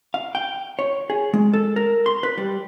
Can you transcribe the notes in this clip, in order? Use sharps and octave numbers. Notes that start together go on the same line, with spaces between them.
F5
G5
C#5
G#4
G#3
A4
A#4
C6
B4
G3